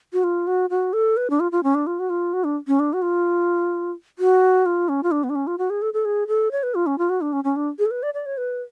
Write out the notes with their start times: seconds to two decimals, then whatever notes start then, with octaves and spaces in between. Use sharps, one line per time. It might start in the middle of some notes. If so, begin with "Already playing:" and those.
0.13 F#4
0.24 F4
0.47 F#4
0.70 F#4
0.93 A4
1.17 B4
1.30 D4
1.40 F4
1.52 F4
1.63 C#4
1.75 D4
1.87 F4
1.99 F#4
2.10 F4
2.33 F#4
2.44 D4
2.68 C#4
2.80 D4
2.93 F#4
3.02 F4
4.19 F#4
4.66 F4
4.89 C#4
5.03 F4
5.11 D4
5.24 B3
5.30 D4
5.35 C#4
5.47 F4
5.58 F#4
5.70 G#4
5.82 A4
5.94 A4
6.05 G#4
6.28 A4
6.52 C#5
6.63 B4
6.75 F4
6.86 C#4
6.98 F4
7.10 F#4
7.21 D4
7.33 C#4
7.44 C#4
7.56 D4
7.79 G#4
7.86 A4
7.91 B4
8.03 D5
8.14 D5
8.26 C#5
8.37 B4